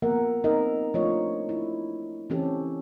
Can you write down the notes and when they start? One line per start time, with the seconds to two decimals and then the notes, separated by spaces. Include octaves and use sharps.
0.02 F3 A#3 B3 A#4 E5 F#5
0.44 F3 C4 D#4 A#4 D#5 E5
0.94 F3 A3 D4 F4 C#5 D#5
1.49 E4
2.30 E3 C4 C#4 G4 A4